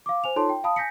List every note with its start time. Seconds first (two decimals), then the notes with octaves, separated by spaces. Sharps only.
0.06 F5 D6
0.24 C5 G#5 F7
0.36 D#4 F4 A4 C#5 A5 C6
0.49 G5
0.64 F5 A5 B5 D#6
0.76 G#5 G6 A#6 B6 C#7